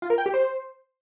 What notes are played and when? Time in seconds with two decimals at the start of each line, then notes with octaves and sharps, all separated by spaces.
0.02 F4
0.10 A#4
0.18 G5
0.26 G4
0.34 C5